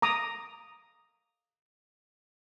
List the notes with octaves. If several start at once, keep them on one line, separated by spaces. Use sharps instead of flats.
A#5 D6 D#6